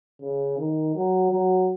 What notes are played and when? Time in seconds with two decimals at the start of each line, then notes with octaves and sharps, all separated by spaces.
0.22 C#3
0.59 D#3
0.96 F#3
1.31 F#3